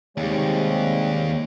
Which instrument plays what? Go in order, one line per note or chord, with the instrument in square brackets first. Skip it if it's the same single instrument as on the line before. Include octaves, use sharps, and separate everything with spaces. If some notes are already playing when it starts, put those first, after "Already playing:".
[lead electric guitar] D#2 [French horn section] C3 G3 G#3 [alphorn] C#5